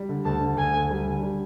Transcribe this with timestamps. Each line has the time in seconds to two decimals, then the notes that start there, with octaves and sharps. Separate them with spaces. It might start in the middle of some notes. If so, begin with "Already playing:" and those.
Already playing: G3
0.09 D3
0.25 D2 A5
0.41 D3
0.57 D2 G#5
0.73 D2
0.91 G3
1.06 D3
1.23 G3